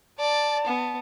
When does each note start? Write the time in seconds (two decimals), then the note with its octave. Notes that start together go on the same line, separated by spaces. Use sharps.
0.20 D5 A5
0.67 B3